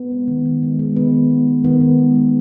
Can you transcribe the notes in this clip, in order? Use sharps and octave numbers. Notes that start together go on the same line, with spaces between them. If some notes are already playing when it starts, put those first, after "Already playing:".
Already playing: B3
G#3
D#3
D#3
G#3
G#3
D#3 B3
D#3
G#3
G#3
D#3 B3
D#3
G#3
G#3